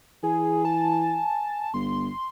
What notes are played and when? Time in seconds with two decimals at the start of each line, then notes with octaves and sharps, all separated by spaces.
0.23 E3 G#4 G#5
0.65 A5
1.74 G1 C6